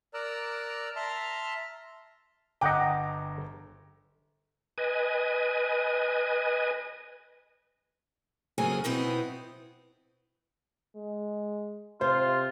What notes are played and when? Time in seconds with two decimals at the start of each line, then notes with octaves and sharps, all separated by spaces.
0.14 A#4 D5 A#5 D6 E6 F#6
0.96 E5 A5 A#5 C6 F6
2.61 G1 D#5 F#5 G5 A#5 D6
4.78 B4 D#5 G#5
8.58 F2 C#3 F#3 A#3 G#4 G#5
8.84 B2 B3 C4 D#4 E4
10.96 G#3
12.01 C3 F4 C5